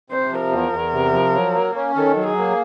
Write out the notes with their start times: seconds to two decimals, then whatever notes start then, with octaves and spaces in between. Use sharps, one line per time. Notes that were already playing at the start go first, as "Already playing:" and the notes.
0.10 C3 C5
0.31 F3
0.41 A#4
0.52 E2
0.72 E2
0.93 C3
1.13 F3
1.34 F#3
1.55 A#3
1.75 C#4
1.96 D#3 A4
2.16 F#3
2.26 G#4
2.37 A#3